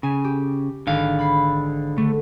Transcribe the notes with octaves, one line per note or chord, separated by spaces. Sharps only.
C#3 G#5
G4
G#1 D3 F5
B5 C7
D3 A3